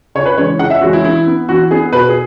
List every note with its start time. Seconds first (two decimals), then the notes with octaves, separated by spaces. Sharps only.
0.15 C#3 C#5
0.26 B4
0.38 E3 G#3 C#4 C#5
0.59 C#3 F#5
0.70 E5
0.81 E3 G#3 C#4 F#4
0.93 E4
1.04 E3 E4
1.27 B3
1.49 E3 F#4
1.71 B3 G#4
1.93 B2 B4
2.09 G#4